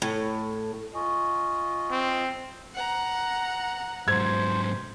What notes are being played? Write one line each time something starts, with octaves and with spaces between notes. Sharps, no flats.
A2
F4 D#5 G#5 C#6
C4
F#5 A#5
G#2 F#3 C5 G#6